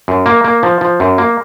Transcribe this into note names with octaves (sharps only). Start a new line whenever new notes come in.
F#2
A#3
A#3
F3
F3
F#2
A#3